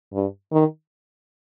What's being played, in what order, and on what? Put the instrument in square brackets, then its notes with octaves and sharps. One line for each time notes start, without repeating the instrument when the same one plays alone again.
[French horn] G2
D#3